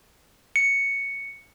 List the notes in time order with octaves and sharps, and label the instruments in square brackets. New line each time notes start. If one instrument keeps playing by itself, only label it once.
[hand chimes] C#7